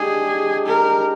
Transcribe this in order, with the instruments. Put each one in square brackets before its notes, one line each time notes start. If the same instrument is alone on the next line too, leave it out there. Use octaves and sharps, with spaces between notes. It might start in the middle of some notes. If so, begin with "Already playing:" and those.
Already playing: [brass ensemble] G#3 D4 G4 [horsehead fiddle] G#4
[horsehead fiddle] A#4